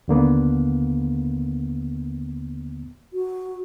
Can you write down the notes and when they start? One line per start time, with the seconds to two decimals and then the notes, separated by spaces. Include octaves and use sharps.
0.08 D#2 D3 A#3 B3
3.13 F#4